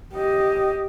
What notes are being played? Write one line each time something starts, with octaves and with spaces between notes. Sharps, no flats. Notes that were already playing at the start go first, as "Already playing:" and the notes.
G4 D#5